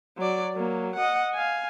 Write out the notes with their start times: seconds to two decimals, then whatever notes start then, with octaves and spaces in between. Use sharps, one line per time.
0.17 F#3 D5
0.54 F#3 A#3
0.96 D#5 F#5
1.34 F5 G#5